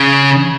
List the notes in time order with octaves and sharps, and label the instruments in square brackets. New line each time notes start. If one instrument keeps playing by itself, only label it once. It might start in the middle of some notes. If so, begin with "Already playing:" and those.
Already playing: [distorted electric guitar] C#3